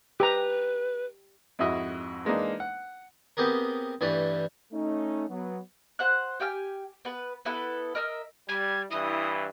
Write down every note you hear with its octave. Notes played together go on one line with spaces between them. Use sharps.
G4 B4 A#5
F2 G#2 E4 F#4 D#5 E5
E3 G#3 A#3 D4 D#4
F#5
B3 C4 G4 G#4 A#4
G2 E3 G3 A3
A3 C#4 D#4
F#3 B3
C5 F#5 F#6
G4 G5 G#5 F6
B3 B4
B3 E4 A4 B4
A#4 D#5 E5 F6
G3 G#6
G2 E3 E4 D#6